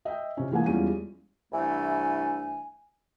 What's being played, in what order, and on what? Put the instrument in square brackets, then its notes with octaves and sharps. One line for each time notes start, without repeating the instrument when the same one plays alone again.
[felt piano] D#5 E5 G5
C3 C#4
E3 G#3 A#3 F#5 G#5
E2 F3 G3 G#3 C#4 D#7
[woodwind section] C2 E3 A3 D4 G#5